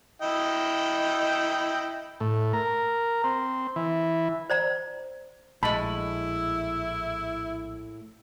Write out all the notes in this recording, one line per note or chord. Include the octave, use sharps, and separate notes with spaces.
E4 D#5 G5
A2
A#4
C4
E3
C5 D5 A#5
A#1 A2 G#3 E4 A5 B5